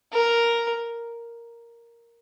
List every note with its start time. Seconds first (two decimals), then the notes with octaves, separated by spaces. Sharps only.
0.13 A#4